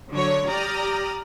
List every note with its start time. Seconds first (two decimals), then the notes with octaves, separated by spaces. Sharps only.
0.12 D3 F#3 C#5
0.47 G4 D5 A#5 D#6 F6